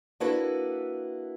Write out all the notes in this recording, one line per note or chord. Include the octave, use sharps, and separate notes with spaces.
A#3 D4 E4 F#4 A4 B4